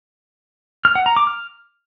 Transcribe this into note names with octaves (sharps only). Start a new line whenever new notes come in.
F6
F#5
A#5
D6
F6